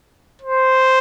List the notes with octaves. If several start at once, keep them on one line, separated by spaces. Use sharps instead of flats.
C5